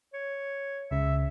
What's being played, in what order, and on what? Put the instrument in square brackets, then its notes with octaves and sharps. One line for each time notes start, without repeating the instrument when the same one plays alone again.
[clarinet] C#5
[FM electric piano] C#2 C#3 [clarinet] E5